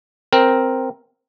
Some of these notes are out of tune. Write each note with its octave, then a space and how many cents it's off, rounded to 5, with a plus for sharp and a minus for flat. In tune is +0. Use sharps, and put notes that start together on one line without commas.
C4 +0 A#4 +0